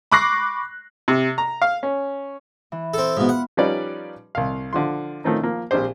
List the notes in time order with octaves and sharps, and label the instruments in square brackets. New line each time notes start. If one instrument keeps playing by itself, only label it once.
[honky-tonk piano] B5 C#6 D6 F#6 A#6 C7
[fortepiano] C3
A#5
F5
C#4
[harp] E3
[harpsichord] C4 A4
[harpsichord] G#2 B2 [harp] B3 F4
[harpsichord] F#5
[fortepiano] F3 G3 C#4 D#4 B4 D5
C2 F5
D3 F3 C6
D#3 F3 A3 C4 C#4 D#4
F3 A#3
A#1 C4 D4 G4 C5